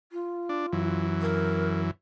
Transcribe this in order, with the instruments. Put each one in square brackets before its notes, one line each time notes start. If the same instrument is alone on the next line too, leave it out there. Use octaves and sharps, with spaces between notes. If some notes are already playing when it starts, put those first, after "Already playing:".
[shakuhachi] F4
[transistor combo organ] D4
F#2 E3
[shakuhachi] A#4